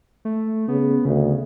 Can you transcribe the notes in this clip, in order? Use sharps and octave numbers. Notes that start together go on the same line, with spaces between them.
A3
C#3 B3
D2 C#3